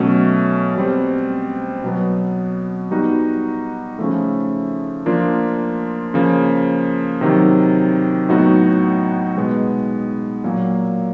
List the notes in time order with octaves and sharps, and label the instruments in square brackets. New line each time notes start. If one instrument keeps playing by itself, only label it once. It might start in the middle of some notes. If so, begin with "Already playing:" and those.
Already playing: [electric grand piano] B2 F#3 A3 C#4
B2 G3 C4
B2 F#3 B3
G3 B3 D#4 F#4
C#3 F3 A3
F3 A#3 D4 F4
C#3 F3 A#3
C3 D#3 F#3
A2 F#3 B3 D#4 F#4
B2 G#3 B3
A#2 F#3 A#3